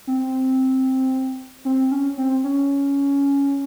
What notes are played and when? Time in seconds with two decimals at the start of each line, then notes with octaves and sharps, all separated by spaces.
0.07 C4
1.65 C4
1.91 C#4
2.18 C4
2.44 C#4